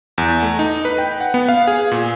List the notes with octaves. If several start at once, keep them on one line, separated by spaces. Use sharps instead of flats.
E2
A3
D#4
B4
G5
F#5
B3
F5
G#4
A#2